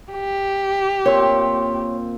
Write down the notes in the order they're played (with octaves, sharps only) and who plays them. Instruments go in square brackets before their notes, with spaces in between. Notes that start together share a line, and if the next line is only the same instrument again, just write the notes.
[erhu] G4
[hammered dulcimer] A#2 C4 [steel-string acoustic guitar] C#5